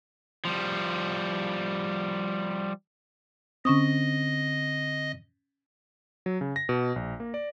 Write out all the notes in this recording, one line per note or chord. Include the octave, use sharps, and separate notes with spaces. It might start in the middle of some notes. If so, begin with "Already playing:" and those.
F3 G3
D3 C4 C#4 D#5 C#6 D#6
F#3
C#3
A#6
B2
A#1
A#3
D5